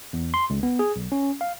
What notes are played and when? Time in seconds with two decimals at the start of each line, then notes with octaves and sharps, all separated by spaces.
0.13 E2
0.34 C6
0.50 C#2
0.63 B3
0.79 G#4
0.96 B1
1.12 C#4
1.41 F5